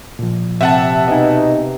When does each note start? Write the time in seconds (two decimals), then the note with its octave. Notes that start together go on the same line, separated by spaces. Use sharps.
0.19 A#2 F3
0.61 C3 E5 F#5 A5
1.08 B2 D#4 D#5 G#5